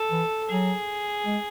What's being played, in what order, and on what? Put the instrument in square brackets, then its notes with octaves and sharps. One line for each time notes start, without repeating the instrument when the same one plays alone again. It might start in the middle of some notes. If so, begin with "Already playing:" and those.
Already playing: [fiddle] A4
[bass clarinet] E3
[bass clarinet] F#3 [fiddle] G#4
[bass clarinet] G#3